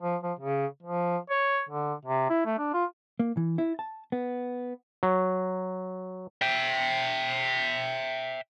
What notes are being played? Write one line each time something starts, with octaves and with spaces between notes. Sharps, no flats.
F3
F3
C#3
F3
C#5
D3
C3
E4
A3
D4
F4
A#3
E3
E4
A5
B3
F#3
E5 G5